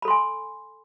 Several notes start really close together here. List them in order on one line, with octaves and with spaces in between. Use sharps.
B5 A4 C6 G#5